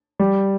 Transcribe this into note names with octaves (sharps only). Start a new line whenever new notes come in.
G3